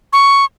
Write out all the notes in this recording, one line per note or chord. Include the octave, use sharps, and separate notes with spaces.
C#6